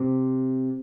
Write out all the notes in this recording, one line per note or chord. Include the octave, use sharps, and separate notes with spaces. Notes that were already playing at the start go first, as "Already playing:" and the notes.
Already playing: C3